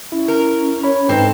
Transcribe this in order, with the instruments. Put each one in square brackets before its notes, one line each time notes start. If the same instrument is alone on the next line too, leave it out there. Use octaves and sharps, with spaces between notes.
[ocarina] C#4 [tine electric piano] E4
[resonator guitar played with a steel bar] A#4
[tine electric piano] C#5 B5
[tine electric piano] G#2 D#4 [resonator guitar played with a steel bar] C4 A4 [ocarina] B4